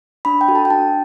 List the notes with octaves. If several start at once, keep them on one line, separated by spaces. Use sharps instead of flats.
D4 B5
G5
F#4 A4
A5
G5
D4 A5